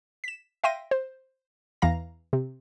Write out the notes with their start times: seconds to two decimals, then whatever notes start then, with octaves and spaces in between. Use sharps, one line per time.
0.24 B6 E7
0.64 E5 F5 G5 C6 A#6 D#7
0.91 C5
1.82 E2 E3 F5 A#5 A#6
2.33 C3